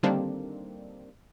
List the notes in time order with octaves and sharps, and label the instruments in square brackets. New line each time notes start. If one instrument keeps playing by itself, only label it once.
[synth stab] D3 D#3 G3 A#3 C4 D4